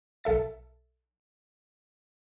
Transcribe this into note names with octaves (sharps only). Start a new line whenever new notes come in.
B1 A4 E5 A6